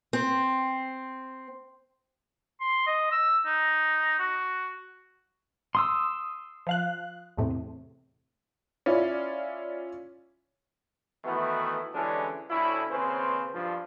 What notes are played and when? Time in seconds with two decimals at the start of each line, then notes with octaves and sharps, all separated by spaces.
0.13 C4
2.60 C6
2.87 D#5
3.12 E6
3.46 D#4
4.19 F#4
5.75 C6 D#6 E6
6.67 F3 F5 F#6
7.37 E2 A2 C3
8.86 C#4 E4 F4 D5
11.24 D#3 E3 A3 B3 E4 F#4
11.94 D3 E3 G3 G#3 C#4 D4
12.50 D2 A2 C#4 E4
12.90 D#2 C#3 C4 C#4 B4 C5
13.54 G2 F3